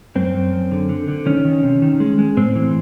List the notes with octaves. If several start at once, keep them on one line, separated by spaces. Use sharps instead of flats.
F#2 C4
F#2
F#2
D3
D3
D3
D#3 C#4
D#3
C3
D#3
G#3
G#3
A2 C4
E3